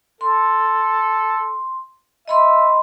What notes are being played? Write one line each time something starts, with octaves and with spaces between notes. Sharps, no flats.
A4 C6
D#5 E5 B5 C6